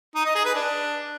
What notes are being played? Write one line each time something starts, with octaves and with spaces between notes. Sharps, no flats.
D#4
D#5
G#4
B4
D4